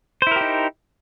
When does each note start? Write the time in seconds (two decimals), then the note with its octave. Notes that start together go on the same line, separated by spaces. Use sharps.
0.22 C5
0.27 E4
0.31 A#4
0.36 G4
0.41 D#4